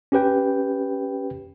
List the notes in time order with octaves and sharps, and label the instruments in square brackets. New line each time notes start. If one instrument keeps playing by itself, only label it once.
[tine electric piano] C#4 G4 B4 G5